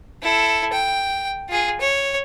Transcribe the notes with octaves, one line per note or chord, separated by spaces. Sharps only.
E4 A4
G5
F4 G#4
C#5